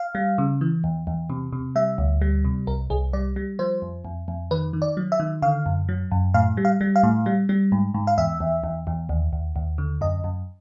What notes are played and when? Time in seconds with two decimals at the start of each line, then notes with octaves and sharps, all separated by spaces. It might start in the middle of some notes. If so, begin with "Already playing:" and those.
Already playing: F5
0.15 G3
0.38 C#3
0.61 E3
0.84 E2
1.07 E2
1.30 C3
1.53 C3
1.76 G3 E5
1.98 D2
2.22 G3
2.45 C3
2.67 C2 A#4
2.90 C2 G#4
3.13 G3 D5
3.36 G3
3.59 F3 C5
3.82 F2
4.05 F2
4.28 F2
4.51 D#3 B4
4.73 D#3
4.82 D5
4.97 F#3
5.12 E5
5.20 D#3
5.42 D3 F5
5.66 F#2
5.89 F#3
6.11 F#2
6.34 A2 F5
6.57 G3
6.65 F5
6.81 G3
6.96 F5
7.03 A2
7.26 G3
7.49 G3
7.72 G#2
7.94 G#2
8.07 F5
8.18 E2 E5
8.40 E2
8.64 E2
8.87 E2
9.09 D#2
9.33 D#2
9.56 D#2
9.78 D3
10.01 F#2 D#5
10.24 F#2